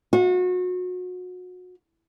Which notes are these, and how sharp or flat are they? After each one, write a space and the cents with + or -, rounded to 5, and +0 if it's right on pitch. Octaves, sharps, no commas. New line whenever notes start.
F#4 -30